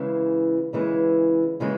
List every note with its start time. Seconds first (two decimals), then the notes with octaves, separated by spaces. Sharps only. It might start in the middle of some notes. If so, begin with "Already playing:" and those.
Already playing: C#3 E3 G#3
0.73 C#3 E3 G#3
1.60 C#3 E3 G#3